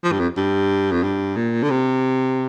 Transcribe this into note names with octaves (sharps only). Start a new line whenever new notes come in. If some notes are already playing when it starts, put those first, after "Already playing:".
F3
G2
F2
G2
F2
G2
A#2
D3
C3